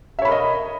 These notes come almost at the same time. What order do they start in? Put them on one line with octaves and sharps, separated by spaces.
E5 C#5 B5 A#4 D#5